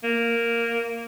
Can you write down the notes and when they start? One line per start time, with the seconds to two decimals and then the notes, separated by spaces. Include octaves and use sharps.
0.04 A#3